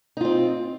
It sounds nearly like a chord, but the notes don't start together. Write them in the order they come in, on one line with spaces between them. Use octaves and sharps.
D#4 F4 C4